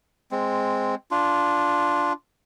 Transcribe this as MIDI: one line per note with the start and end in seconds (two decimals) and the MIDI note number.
0.31 0.95 56
0.31 0.95 60
1.11 2.13 62
1.11 2.13 65